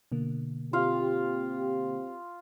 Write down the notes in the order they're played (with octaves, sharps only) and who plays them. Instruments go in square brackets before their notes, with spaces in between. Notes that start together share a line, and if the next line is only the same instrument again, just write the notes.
[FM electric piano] B2 D3 A#3
[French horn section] C4 G4 [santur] F4 F5